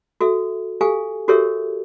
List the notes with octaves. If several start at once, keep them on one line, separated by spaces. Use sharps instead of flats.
F#4 A4 E5
G4 A4 F5 G#5
F#4 G4 A4 A#4 C#5 E5